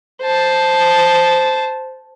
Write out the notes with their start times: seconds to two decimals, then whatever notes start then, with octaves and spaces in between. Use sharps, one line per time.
0.22 C5 A5